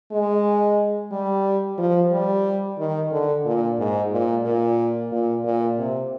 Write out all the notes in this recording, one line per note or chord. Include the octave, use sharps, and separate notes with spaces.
G#3
G3
F3
G3
D#3
D3
A#2
G#2
A#2
A#2
A#2
A#2
C3